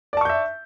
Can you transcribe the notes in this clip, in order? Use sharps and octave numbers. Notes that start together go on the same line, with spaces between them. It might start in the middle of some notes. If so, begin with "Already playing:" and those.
D5 E5 A5 C#6 G6